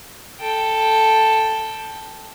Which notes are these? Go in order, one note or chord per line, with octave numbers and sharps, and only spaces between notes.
A4 G5